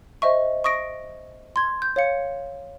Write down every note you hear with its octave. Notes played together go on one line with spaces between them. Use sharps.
C5 D#5 E5 C#6
C#6 D#6 A#6 D7
C6 G#6
G6
C#5 F5 C#7